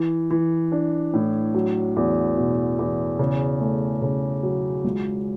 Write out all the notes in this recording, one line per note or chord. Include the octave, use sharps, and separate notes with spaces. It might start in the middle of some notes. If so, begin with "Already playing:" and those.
Already playing: E3
E3
D4
A2
F#3
E2
B2
E2
C#3
A3
C#3
F#3
C#2